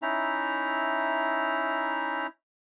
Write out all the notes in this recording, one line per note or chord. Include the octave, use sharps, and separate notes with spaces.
C#4 D#4 E4 E5 A#5